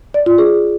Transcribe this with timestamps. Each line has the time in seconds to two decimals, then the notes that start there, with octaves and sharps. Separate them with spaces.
0.14 D5
0.26 F4
0.38 G#4